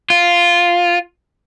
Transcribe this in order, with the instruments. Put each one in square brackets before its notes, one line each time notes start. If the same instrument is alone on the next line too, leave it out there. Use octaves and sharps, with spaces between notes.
[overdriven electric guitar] F4